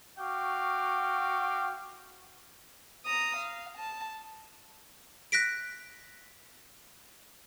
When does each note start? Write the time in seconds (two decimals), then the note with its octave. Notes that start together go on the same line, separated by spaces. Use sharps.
0.19 F#4 F5 G5 C#6 D6
3.06 A#5 D#6
3.36 F5
3.77 A5
5.32 F#6 A#6 B6 D7